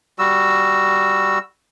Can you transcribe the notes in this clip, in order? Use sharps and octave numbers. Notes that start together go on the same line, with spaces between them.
G3 F#4 E6